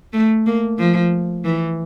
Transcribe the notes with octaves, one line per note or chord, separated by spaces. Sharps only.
A3
A#3
F3
E3